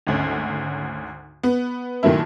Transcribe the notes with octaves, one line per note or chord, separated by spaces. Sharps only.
G#1 D2 C#4
B3
A#2 D#3 F#3 A3 E4